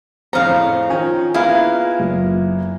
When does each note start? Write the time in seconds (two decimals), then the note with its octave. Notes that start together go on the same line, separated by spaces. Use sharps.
0.33 F2 A2 C#3 C5 F5 A#5
0.90 D#3 C#4 F4 G#5
1.34 G#3 A#3 B3 E4 F4 F5
1.99 F#1